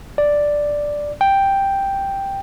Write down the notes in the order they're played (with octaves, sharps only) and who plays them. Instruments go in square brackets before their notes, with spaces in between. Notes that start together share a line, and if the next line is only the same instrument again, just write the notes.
[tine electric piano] D5
G5